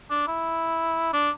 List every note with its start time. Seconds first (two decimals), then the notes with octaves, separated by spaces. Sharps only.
0.10 D4
0.28 E4
1.13 D4